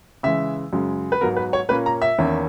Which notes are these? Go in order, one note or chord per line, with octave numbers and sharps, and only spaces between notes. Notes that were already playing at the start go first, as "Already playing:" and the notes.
C#3 E3 G#3 E5
F#2 C#3 G#3
B4
G#2 F#3 B3 A#4
B4
C#5
A#2 A#3 C#4 B4
A#5
E5
E2 D#3 A#3 C#4